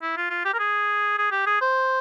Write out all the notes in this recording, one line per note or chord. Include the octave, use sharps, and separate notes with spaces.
E4
F4
F4
G4
A#4
G#4
G#4
G4
G#4
C5